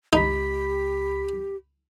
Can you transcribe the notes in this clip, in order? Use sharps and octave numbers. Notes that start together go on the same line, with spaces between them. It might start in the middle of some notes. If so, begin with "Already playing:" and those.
C#2 D#4 G4 B5 B6